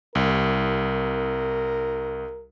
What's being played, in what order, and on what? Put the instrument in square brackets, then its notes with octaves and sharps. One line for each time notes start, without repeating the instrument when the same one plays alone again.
[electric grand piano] C2 [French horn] A#4